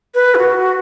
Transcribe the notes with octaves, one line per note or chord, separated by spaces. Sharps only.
B4
E4
F#4